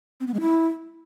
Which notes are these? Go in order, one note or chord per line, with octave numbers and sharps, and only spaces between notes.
C4
B3
G#3
E4